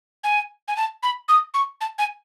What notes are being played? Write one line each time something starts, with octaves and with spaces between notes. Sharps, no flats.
G#5
G#5
A5
B5
D#6
C#6
A5
G#5